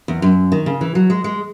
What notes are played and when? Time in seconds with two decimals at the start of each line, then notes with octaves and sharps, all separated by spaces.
0.08 E2
0.22 F#2
0.52 D#3
0.66 C#3
0.81 E3
0.95 F#3
1.10 G#3
1.24 G#3